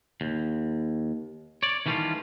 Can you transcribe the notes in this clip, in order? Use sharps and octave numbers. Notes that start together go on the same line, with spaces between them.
D#2
C#5 D5
D#3 E3 G3 A3 C#4 F4